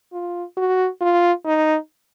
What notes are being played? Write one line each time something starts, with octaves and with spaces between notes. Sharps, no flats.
F4
F#4
F4
D#4